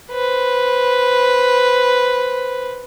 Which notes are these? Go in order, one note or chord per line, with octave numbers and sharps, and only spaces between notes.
B4 C5